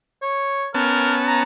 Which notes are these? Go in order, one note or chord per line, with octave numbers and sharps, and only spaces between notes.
C#5
B3 C#4 A#4 A5
A#5